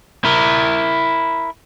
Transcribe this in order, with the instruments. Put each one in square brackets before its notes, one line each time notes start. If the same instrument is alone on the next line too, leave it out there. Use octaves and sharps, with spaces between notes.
[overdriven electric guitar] E4 A#4